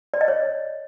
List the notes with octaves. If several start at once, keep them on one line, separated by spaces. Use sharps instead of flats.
D5
D#5
C#5